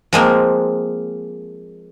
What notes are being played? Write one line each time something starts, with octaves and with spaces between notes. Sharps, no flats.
F3 G#3 A#3 C4